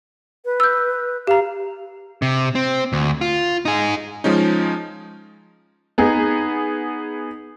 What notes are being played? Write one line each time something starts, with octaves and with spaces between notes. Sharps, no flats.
B4
E6 G6
G4 F5 A#5
C3
C4
D2
F4
D#4 G#4
F3 G#3 C#4 D#4
B3 D#4 G#4